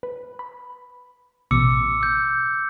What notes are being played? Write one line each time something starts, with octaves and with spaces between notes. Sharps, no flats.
B4
B5
A1 B2 D6 E6 C#7
E6 G6